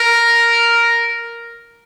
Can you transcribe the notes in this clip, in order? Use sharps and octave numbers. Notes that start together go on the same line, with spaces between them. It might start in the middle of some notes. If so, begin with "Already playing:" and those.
Already playing: A#4